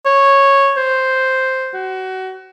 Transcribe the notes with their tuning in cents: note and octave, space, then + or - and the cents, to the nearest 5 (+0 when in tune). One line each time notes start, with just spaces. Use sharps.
C#5 -10
C5 +0
F#4 +25